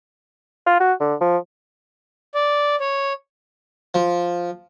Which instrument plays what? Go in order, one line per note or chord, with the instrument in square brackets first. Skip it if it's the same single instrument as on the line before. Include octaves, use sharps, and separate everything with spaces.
[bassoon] F4
F#4
D3
F3
[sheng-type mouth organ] D5
C#5
[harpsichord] F3